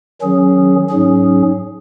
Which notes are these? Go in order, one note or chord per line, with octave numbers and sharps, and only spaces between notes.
D#3 F#3 C#4 G#4
G#2 F#3 C#4 G#4